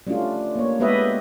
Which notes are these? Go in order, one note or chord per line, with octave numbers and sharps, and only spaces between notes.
G3 A3 C#4 D4 F4
A#3 C#5
G#3 B3 G4 B4 D#5 E5